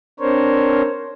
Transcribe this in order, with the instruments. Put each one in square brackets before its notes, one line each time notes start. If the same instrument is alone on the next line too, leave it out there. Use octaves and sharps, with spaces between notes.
[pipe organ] C4 D4 A#4 C5 C#5